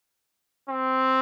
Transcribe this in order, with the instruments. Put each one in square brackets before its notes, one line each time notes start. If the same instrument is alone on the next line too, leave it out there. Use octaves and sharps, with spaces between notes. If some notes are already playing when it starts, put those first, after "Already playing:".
[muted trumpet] C4